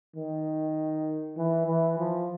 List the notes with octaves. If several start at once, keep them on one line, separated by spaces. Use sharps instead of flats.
D#3
E3
E3
F3